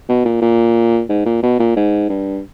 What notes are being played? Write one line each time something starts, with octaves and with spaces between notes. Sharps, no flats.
B2
A#2
A#2
G#2
A#2
B2
A#2
G#2
G2